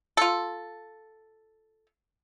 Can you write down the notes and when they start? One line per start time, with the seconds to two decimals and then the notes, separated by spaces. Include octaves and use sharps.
0.17 F4 A4